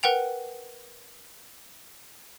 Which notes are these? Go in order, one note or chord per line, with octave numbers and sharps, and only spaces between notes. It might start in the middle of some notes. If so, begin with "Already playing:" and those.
A#4 B4 F#5 G5 F7